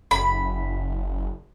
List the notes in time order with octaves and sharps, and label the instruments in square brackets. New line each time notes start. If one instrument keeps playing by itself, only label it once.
[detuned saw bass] F#1 [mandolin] B5